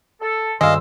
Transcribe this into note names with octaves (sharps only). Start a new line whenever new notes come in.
A4
D2 G2 D#3 G#3 C5 D#5 F5 E6